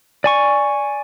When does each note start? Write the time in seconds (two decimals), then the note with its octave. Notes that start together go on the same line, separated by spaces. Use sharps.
0.24 D5 G#5 C#6